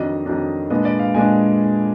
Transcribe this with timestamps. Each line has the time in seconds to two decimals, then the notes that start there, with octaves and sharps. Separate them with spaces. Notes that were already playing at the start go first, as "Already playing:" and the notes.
Already playing: F2 D#3 F#3 D4 D#5
0.26 F2 D#3 F#3 D4
0.70 A#2 G#3 B3 D4 D#5
0.85 D5
0.99 F5
1.14 A#2 G#3 B3 D4 G#5